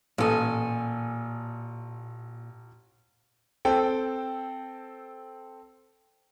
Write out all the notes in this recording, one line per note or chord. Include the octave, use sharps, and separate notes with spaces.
A1 A#2 A4 G#5 D#6
C4 A4 G5